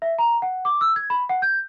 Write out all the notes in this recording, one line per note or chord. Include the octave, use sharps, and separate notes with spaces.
E5
A#5
F#5
D6
E6
G#6
B5
F#5
G6